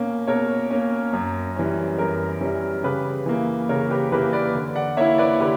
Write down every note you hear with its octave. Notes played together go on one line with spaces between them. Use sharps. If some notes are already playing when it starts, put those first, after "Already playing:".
Already playing: B2 A#3 C#4
B2 A#4 C#5
A#3 C#4
F#2
E3 G3 C#4
F#2 A#4
E3 G3 C#4
C#3 G4 B4
E3 A#3
C#3 A#4 C#5
G4 B4
E3 A#3 G4 B4
B4 D5
D3
D5 F#5
A#3 E4 C#5 E5
B4 D5
D3 G4 B4